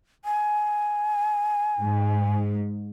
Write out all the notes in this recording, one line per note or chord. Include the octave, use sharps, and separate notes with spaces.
G#5
G#2